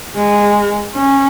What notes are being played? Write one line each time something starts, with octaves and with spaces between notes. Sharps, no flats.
G#3
C#4